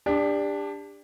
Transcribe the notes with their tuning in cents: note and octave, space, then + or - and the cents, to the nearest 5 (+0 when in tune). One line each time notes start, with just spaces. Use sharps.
D4 +0 G4 +35